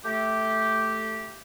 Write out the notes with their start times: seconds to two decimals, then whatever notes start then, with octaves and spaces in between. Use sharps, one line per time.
0.06 A3 G4